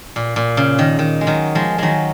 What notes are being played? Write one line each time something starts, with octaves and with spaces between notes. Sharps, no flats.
A#2
A#2
C#3
D#3
D#3
G#3
D#3 F#3
F3 G#3
D#3 F#3 G#3